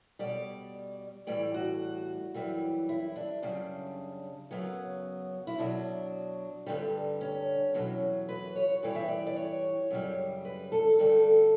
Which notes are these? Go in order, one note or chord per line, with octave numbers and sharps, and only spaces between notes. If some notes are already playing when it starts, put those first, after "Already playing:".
B2 G3 D5
A2 E3 G3 D5
F#4
F#2 E3 G3
E4
D4
F#2 C#3 G3
F#2 C#3 F#3 B3
E4
B2 F#3 D4
G2 D3 G3
C#4
E2 B2 F#3
B4
C#5
G2 E3 G3 D5
E5
D5
D5
C#5
F#2 C#3 G3
B4
A4
G2 D3 G3 A4